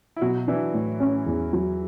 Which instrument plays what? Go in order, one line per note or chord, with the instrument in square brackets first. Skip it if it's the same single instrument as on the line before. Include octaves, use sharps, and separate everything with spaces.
[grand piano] E4
[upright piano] B2 [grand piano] F#3 F#4
[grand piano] E3 E4 [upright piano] D4
[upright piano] A2
C#4
E2
F#3